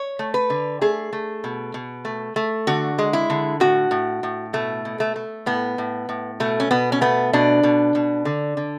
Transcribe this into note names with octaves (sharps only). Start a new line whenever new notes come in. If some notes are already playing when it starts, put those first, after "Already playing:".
Already playing: C#5
A3
B4
D3
A3 G#4
A3
B2
B2
A3
A3
D3 F#4
G#3
E4
D3
A2 F#4
A2
A2
B2 A3
B2
A3
A3
A2 B3
A2
A2
B2 A3
C#4
B2 B3
C#4
A3 B3
B2 D4
B2
B2
D3
D3